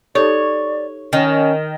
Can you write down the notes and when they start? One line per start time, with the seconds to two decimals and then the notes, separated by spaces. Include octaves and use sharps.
0.15 D#4 G4 A4 C#5 D5
1.13 D#3 C#4